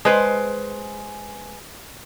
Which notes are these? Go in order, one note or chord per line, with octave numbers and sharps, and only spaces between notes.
G#3 B4 C5